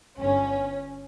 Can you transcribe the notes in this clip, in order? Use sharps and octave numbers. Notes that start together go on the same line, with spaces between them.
G1 G2 D3 C#4